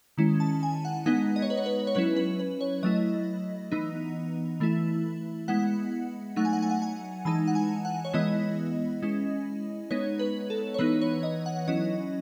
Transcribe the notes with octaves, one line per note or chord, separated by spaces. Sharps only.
D#3 G#3 C#4 E4
A5
G#5
F#5
G#3 B3 D#4 F#5
D#5
C#5
B4
C#5
B4
C#5
F#3 C#4 E4 B4
B4
B4
C#5
F#3 A3 E4 D#5
E3 B3 D#4
E3 A3 E4
G#3 B3 E4 F#5
F#3 A3 D#4 F#5
G#5
F#5
G#5
F#5
G#5
E3 G#3 D#4 A5
F#5
G#5
F#5
C#5
E3 G#3 B3 E4 D#5
G#3 C#4 E4
G#3 B3 D#4 C#5
B4
A4
C#5
E3 B3 D#4 B4
C#5
D#5
F#5
F#3 C#4 E4 D#5